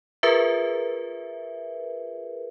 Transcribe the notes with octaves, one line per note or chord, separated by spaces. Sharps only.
F4 G#4 A#4 B4 E5